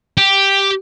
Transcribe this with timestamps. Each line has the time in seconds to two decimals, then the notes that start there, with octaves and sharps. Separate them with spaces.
0.17 G4